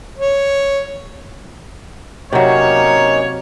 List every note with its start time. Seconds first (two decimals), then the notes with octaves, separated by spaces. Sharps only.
0.18 C#5
2.33 C3 F#3 A#3 C#4 D#4 C#5